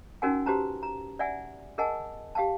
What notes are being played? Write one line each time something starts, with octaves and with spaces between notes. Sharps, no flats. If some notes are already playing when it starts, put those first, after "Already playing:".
C#4 D#4 F#4 A#4 F#5 G#5
F#4 G4 B4 C5 A5 A#5
A#5
D5 E5 F#5 G#5
G#4 A#4 D#5 F#5 G#5 A5
G4 F5 G5 A5